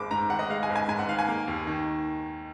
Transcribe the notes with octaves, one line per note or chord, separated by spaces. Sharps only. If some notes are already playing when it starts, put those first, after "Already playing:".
Already playing: G#1 G#3 B5 D6
G#2 A#5
D#3 F#5
D#5
G#3 F5
G#5
G#1
G#5
G#2 G#5
F#5
D#3 F5
G#5
A#3
D#2
D#3